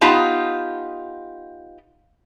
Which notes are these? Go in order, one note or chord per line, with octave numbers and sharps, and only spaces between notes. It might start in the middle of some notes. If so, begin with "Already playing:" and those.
B3 D#4 F4 G4 A5